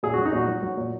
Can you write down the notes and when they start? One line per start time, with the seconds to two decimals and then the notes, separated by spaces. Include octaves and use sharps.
0.03 A#2 G#4
0.14 F#3 F#4
0.25 D#4
0.33 A#2 F#4
0.48 F#3
0.63 F#3
0.77 A#2